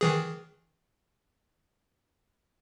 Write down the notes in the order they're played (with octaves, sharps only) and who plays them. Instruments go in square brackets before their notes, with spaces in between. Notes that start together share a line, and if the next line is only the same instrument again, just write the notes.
[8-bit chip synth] D#3 E3 G#4